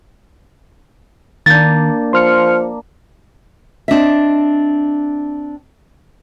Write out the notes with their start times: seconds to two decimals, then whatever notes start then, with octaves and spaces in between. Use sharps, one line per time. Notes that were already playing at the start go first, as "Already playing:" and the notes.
1.46 D#3 A#3 D4 G6 A6
2.13 F3 C6 F6 C#7
3.88 C4 D4 D#5 E5